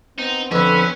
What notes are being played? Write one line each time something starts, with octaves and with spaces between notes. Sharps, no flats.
B3 C4 D#4
F2 D3 C#4 B4 C#6 E6